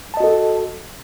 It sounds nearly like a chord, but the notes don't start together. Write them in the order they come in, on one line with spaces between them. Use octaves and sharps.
A5 D#5 F#4 A4